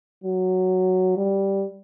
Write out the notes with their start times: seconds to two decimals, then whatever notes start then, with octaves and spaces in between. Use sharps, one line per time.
0.24 F#3
1.17 G3